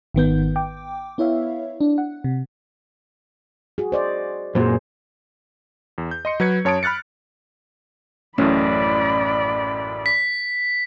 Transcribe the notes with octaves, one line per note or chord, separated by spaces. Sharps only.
G#1 D#3 B3 G6
G5 D6
B3 E4 C#5 E5 F5
D4
F#5
C3
F#4 G#4
C5 D5 D#5
F#2 A#2 F#3 G#4 C5
E2
G6
D#5 C6 C#7
F#3 B4 G#6 C#7
F#2 C#5 A5 D#6 D7
B5 F6 F#6 A6 C#7
A1 F#2 A2 C#4 D5 B5
B6